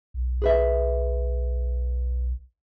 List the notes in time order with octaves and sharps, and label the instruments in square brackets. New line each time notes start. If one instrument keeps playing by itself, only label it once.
[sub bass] B1
[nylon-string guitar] G#4 B4 E5